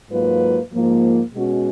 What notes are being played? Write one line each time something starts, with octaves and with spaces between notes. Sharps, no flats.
G#2 F#3 A#3 F4 B4
G#2 F3 A#3 F4
B2 G#3 C#4 F#4